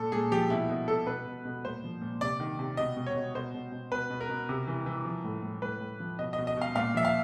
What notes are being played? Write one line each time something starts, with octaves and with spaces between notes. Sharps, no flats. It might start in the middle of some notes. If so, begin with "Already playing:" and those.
Already playing: A#2 A4
A#2 G#4
F3 G4
B2 E4
B2
B2 A4
B2 B4
B2
B2
A#2 C5
F3
A#2
C3 D5
D#3
C3
B2 D#5
B2
C#5
B2
B2 C5
B2
B2
B2 B4
B2
A#4
B2
C3
E3
E3
F3
A2
A2
A2 B4
A2
F3
B2 D#5
B2 D#5
D#5
B2 F5
A#2 F5
F3 E5
F5